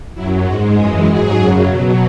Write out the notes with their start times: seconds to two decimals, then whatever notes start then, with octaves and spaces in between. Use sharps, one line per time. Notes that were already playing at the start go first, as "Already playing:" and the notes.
0.14 F#2 F#3 E4
0.44 G#2 G#3 F#4
0.74 F#2 E3 G#3 G#4
1.05 G#2 F#3 G#4
1.35 F#2 C#3 F#3
1.66 B2 F#3